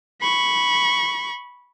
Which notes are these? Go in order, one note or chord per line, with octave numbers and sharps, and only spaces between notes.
B5 C#6